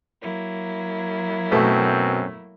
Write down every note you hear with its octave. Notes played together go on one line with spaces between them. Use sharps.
F#3 A#3 E4
F#2 B2 A3 C4